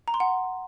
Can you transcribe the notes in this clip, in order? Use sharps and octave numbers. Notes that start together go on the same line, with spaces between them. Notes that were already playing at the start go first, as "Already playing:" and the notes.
A#5
C6
F#5